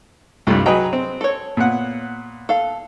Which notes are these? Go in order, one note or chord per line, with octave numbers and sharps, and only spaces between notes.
C2 G2 C4 F4 A4
F#3 G#4 B4 D#5 G5 A#5
C4
A4 C#5
A#2 B3 F#5
A4 F5